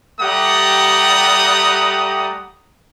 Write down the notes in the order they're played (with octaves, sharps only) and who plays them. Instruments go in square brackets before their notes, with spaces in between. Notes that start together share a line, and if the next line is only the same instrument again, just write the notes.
[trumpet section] G3 A3 G4 F#5 A#5 D#6